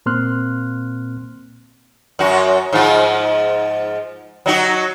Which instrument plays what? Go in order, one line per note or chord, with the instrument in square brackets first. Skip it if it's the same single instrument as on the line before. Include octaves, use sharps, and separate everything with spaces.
[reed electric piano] A#2 A#3 C4 C6 F6 F#6
[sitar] F#2 F#4
G#2 F3 F4
F#3 D#4 F#4